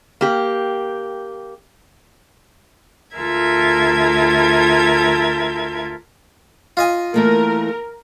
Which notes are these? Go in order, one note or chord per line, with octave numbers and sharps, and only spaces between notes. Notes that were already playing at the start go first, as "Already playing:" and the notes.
A#3 G4
D2 F4 A4 A#4 E5 G#6
F4 D#5 G#5
E3 A3 A#3 A#4